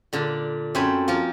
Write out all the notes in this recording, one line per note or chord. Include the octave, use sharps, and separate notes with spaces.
A#2 D3
F#2 A3 C4 C5 G#5 B5
F3 A#3 F4